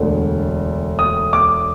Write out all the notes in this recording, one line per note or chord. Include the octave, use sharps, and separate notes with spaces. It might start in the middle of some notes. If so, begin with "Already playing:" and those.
Already playing: E1 D2 D3
D#6
D6